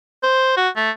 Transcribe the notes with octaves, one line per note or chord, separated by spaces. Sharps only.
C5
F#4
A3